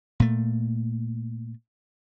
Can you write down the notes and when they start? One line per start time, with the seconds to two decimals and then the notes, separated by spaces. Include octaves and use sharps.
0.20 A#2 A3